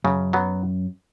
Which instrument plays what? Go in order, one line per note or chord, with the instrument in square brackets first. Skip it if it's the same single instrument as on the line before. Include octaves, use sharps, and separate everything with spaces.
[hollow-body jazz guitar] F#2 [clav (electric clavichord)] C#3
[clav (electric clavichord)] F#3 B3